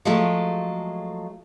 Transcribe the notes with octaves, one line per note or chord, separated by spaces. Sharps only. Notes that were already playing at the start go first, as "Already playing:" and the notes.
F3 F#3 G#3 A3 F4